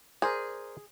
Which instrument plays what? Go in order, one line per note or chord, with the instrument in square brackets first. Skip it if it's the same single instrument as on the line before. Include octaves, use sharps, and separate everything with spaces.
[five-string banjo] G#4 [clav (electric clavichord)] A#4 C5 D5